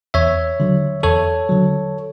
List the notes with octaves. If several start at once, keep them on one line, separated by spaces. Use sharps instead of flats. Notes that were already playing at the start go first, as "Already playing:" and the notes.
E2 C#5 E5
D3 F#3
E2 A4 C#5
D3 F#3